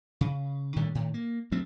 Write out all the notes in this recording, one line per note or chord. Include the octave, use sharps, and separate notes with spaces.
C#3
A2 D3 D#3 G3
A2 D#3
A#3
D2 F#3 A3 C4